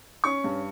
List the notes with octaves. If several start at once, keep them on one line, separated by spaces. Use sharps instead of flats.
C#4 C#6
G2